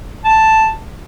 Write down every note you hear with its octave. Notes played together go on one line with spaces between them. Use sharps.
A5